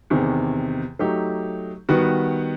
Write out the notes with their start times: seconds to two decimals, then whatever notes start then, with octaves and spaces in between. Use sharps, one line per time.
0.10 E2 C3 D#3
0.99 F#3 A3 D#4 G4
1.89 D#3 G3 B3 F#4